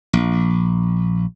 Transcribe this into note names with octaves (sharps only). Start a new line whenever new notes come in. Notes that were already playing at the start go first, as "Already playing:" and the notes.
A#1